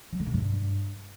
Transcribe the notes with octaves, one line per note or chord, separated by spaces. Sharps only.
F#3
D3
C3
G2